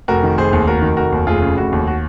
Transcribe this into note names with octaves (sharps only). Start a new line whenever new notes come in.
F1 F#4 A#4
D#3
F1 G#4 C5
D#2
F1 F#4 A#4
D#3
F1 F#4 A#4
D#2
F1 F4 G#4
C#3
F1 F#4
D#2
F#4